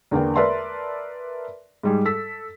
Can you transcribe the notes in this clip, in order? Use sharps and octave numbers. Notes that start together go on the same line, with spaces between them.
E2 D3 A#3 B3 G5
A#4 B4 D5 E5 A5 C6
G#2 G3 G#4
A4 E6 B6